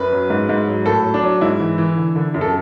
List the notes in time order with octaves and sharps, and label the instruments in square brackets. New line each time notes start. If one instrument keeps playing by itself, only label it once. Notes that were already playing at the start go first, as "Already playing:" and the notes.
Already playing: [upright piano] F#2 B4
F#3
G#2
G#2
F#3
A2 A4
F#3
D4
F#3
G#2 E4
E3
E3
D3
D3
F#2
A4